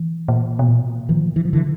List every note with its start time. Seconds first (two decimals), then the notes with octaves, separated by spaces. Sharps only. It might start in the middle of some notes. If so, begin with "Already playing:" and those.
Already playing: E3
0.28 A#2
0.59 B2
0.68 A#2
1.09 A2 D#3 F3
1.36 C#3 E3
1.45 F3
1.53 D3 E3